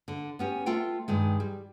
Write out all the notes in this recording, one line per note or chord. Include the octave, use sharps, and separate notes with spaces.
D3
B3 C#4 G4
A3 F4 G5
G2 D#3 G#3
G3